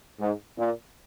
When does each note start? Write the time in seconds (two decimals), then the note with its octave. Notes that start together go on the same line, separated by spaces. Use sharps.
0.19 G#2
0.58 A#2